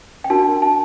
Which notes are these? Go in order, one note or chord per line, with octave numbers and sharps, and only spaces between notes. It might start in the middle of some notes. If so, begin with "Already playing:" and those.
G5
D4 F#4 A#4 A5
A5